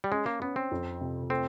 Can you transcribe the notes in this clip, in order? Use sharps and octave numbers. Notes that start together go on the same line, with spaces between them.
G3
G#3 C#4
A#3
B3 C#4
C4
F2
C3
A3 C4